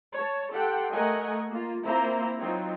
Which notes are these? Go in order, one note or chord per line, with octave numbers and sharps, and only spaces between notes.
C#5 A5
G4 A4 F#5 G5 C6
A3 A#4 D#5 F#5 G#5
A#3 F4
A#3 C4 E4 F4 C5 A#5
F#3 C4 D#4 F4